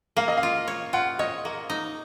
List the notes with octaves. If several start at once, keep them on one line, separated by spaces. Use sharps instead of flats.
A#3 F5
D#5
F5
F4
C#5
F4 F#5
C#5 D#5
A#3
D#4